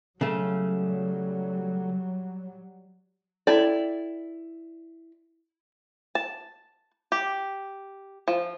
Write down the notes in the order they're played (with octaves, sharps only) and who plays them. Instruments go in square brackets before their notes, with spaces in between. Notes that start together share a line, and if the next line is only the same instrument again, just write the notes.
[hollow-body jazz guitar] C#3 A3 [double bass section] F#3 G3
[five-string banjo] E4 D5 [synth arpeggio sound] A4 G5 A6
[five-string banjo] A5
G4
F3